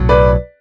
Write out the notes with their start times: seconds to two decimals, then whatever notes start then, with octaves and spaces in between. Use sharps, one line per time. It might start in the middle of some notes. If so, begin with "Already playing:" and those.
Already playing: B1 A2 F#3
0.09 B4 D5